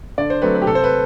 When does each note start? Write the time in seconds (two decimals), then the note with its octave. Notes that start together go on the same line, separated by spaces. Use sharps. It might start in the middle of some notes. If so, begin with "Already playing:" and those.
0.18 D3 D5
0.30 C5
0.42 F#3 A3 C4 B4
0.55 B4
0.62 G4
0.66 C3 A4
0.75 C5
0.84 B4